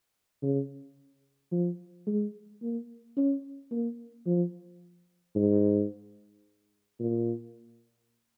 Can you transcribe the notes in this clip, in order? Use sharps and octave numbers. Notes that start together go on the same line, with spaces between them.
C#3
F3
G#3
A#3
C#4
A#3
F3
G#2
A#2